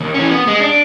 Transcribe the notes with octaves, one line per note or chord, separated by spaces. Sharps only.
D#2
E3 C#4
B3
G#3
D4